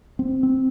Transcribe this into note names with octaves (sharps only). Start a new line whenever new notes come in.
C4
C4